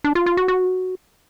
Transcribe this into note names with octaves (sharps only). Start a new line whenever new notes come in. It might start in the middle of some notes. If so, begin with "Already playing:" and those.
D4
F4
F4
F#4
F#4